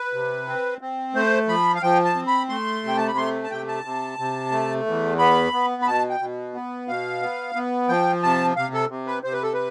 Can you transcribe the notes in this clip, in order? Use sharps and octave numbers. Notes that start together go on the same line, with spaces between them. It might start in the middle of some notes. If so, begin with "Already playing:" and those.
Already playing: B4
C3
C4
C4
A3 C5
F3 B5
F5
F3 G5
A5
C4
B5
A3 C6
C3 G5
A5
B5
A3 C6
A5
C3 G5
A5
C3
C3
A3
E2
B3 B5
B3
B5
B2 A5
G5
B2
B3
B2 F5
B3
B3
F3 G5
C3 A5
C3 F5
A4
C3
B4
C3 C5
B4
A4
B4